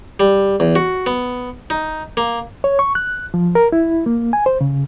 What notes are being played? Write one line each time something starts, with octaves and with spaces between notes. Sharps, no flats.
G3
E2
F#4
B3
D#4
A#3
C#5
C#6
F#6
F3
A#4
E4
A#3
G#5
C5
C#3